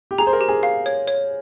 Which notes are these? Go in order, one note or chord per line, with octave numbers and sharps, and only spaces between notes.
G4
G#4 A#5
C5
A#4
G4
G#4
F5
C#5
C#5